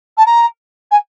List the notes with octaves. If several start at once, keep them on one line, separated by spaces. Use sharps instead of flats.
A5
A#5
G#5